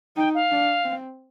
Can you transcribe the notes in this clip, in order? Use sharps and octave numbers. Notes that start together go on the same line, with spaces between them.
D#4 G5
F5
D4
C4